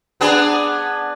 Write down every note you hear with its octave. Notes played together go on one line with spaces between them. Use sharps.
B3 D4 G#4